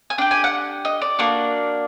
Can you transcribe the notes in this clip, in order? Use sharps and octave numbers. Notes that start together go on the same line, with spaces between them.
G#5
D4 G4 G5
G#5
F#5
D#5
D5
A#3 D4 F#4